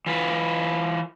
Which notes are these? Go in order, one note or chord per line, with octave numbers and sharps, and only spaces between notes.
E3 F4 B4